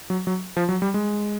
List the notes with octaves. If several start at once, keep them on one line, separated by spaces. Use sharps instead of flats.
F#3
F#3
F3
F#3
G3
G#3